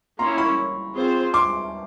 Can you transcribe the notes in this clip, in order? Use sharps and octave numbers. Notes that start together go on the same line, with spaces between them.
A#3 C#4 E4 A#5 C6
B5 C#6
C4 F4 G#4 C5
C6 D6